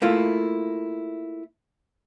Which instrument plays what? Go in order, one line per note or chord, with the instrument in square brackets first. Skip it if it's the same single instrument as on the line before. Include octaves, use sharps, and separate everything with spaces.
[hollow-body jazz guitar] A3 A#3 E4 F4